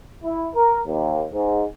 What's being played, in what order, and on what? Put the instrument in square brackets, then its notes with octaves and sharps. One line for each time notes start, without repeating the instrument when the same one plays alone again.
[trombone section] E4
A#4
D#2
G#2